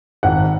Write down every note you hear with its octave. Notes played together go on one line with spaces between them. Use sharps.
G#1 F#5